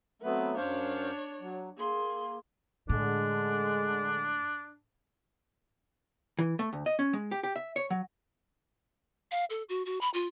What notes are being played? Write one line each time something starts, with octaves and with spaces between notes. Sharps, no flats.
F#3 A3 B3 C4 B4
F#2 D4 C5 C#5 F5
F#3
A#3 G#4 C6
A2 D3 G#3 D4
E3
A3
D2
D#5
C#4
G#3
G4
G4
E5
C#5
F#3
F5
A4
F#4
F#4
B5
F4